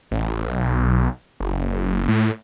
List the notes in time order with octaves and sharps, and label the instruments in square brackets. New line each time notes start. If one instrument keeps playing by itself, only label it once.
[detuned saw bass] A1
B1
F#1
A2